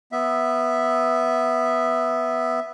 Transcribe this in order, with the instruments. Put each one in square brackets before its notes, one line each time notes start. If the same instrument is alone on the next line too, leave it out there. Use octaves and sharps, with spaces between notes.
[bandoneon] B3 E5